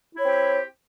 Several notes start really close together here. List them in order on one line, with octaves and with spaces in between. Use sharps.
E4 C#5 C4 G4